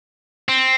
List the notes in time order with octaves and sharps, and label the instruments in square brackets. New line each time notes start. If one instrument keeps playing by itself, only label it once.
[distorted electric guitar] C4